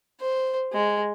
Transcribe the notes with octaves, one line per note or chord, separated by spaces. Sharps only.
C5
G#3